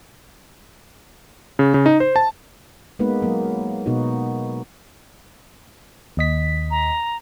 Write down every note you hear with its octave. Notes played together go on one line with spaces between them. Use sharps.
C#3
C#3
D#4
C5
A5
G#3 A#3 B3 D#4 B4
F#3 A#3
B2 B3 D#4 F#4
D#2 D#5 B6
A#5